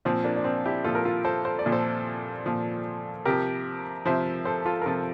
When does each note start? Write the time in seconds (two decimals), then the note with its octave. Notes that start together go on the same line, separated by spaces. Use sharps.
0.05 A#2 F3 C4
0.24 A#3 D4
0.36 D4
0.44 C4
0.65 E4 G4
0.84 A#2 F3 F4 A4
0.95 A#4
1.05 F4 A4
1.25 A4 C5
1.45 C5
1.59 D5
1.66 A#2 F3
1.72 A4 C5
2.46 A#2 F3
3.25 C3 F3 G4 A#4
4.06 C3 F3 C5 E5
4.45 A4 C5
4.65 F4 A4
4.82 A#4
4.86 C3 F3 F4 A4